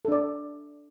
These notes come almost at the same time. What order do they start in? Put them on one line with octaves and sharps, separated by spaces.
A4 D4 D5